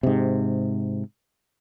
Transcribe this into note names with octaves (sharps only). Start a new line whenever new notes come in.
G#2 C3